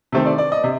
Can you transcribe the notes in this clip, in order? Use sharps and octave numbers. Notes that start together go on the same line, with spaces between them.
C3 D#3 A3 C4
D5
D5
D#5
C3